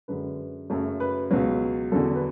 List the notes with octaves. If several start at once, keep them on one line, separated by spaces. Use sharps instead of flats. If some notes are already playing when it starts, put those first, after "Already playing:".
F#2 D3 G#3 B4
F#2 C#3 F#3 A3 A4
B4
C#2 B2 F#3 B4
E2 D3 F#3 A4
B4